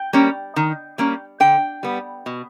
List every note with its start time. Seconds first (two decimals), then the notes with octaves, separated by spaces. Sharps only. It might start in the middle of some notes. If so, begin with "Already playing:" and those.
Already playing: G5
0.13 G3 A#3 C#4
0.56 D#3
0.98 G3 A#3 C#4
1.40 D3 G5
1.83 G3 B3
2.26 B2